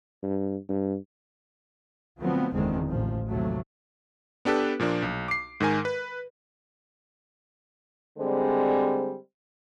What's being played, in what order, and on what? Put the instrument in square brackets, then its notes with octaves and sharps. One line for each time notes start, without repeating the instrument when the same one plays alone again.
[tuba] G2
G2
[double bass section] D3 F3 F#3 A3 B3 C4
F#1 E2 D3 D#3 G#3 C4
A1 F3
D#2 C3 F#3 A3
[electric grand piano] B3 D4 G4 A4 B4
A#2 F3 A#3 D4
B1
D6 C7
G#2 D#3 A#4 G#5
B4
[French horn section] D3 G3 G#3 C4 C5